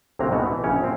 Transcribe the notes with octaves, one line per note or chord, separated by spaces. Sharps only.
D2 C3 F#3 A#3 C4 A#5
B2 D#3 G#3 A3 B3 F#4
E3
A#1 C#3 C#4 C#5 G5
F#2 C4